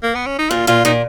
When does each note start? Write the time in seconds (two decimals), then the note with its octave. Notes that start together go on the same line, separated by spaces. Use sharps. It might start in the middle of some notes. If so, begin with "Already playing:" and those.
0.03 A#3
0.15 B3
0.26 C#4
0.38 D#4
0.50 A#2 F4
0.67 A#2 F4
0.85 A#2 D#4